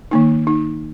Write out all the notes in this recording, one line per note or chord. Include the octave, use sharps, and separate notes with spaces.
D#3 A#3 D#4
D#4